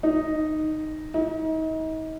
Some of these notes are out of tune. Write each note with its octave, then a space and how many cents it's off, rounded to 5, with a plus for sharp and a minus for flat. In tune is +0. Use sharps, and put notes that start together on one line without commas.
D#4 -5
D#4 +35